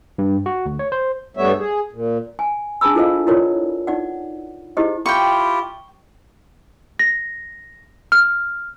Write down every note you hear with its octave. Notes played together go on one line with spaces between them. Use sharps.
G2
F#4
D2
C#5
C5
G2 G3 A3 B3 C#5 E5
G#4
A#2
G#5
D4 G#4 G#5 A5 B5 E6
E4 F4 A4 C5 D#5 F5
E4 F4 A#4 C#5 D5
D#4 D5 F#5
D#4 E4 G4 G#4 C5 D#5
E4 F4 G4 G5 C#6
A#6
F6